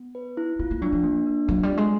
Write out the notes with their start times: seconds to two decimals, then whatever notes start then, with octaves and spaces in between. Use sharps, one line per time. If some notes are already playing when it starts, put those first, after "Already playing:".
Already playing: B3
0.15 B4
0.37 E4
0.59 B3 F4
0.71 A#3
0.82 F#3 D4
0.92 F3
1.04 A#3
1.26 D4
1.48 F#3 F4
1.63 G3
1.70 C4
1.77 G#3